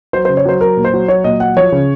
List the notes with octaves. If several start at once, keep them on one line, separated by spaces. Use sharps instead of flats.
F#3 C5
C#3 C5
C#5
F#3 C5
F#3 A#4
A#2
C5
F#3
F#3 C#5
A#2 D#5
F#3 F#5
F3 C#5
C#3